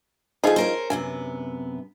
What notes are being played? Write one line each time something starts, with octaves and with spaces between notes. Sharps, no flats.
F3 A3 D#4 G#4
C#4 A#4 C5
F#2 C3 B3 G#5